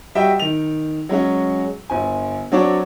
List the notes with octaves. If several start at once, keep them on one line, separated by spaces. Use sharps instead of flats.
G3 F#4 D#5 E5 G5
D#3 F7
F#3 G#3 C#4 F#4
G1 G#5
F#3 C4 D4 F#4 C#5 D5